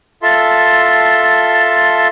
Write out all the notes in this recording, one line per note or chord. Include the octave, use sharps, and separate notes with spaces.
F4 A4 E5 A5 C6